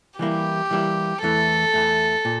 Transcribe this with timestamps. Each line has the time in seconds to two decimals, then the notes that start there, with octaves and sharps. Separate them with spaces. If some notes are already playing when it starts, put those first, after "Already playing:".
0.19 E3 G3 A#3 E4 G4
0.71 E3 G3 A#3 E4
1.23 E2 E3 A3 A4
1.74 E2 E3 A3
2.25 A#2